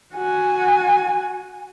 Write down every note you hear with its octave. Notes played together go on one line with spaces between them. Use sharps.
F#4 G#5